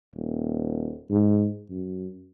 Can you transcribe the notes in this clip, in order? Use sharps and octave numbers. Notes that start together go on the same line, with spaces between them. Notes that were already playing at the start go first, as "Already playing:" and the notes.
D#1
G#2
F#2